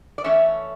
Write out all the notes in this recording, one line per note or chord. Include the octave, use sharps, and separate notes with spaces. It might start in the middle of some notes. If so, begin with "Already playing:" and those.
D5
E3 A3 C#4 C#5 E5